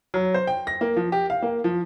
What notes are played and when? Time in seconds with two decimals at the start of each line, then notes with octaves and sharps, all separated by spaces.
0.14 F#3
0.34 C5
0.47 G5
0.67 A#6
0.81 A#3
0.97 F3
1.12 G4
1.30 F5
1.42 A#3
1.64 F3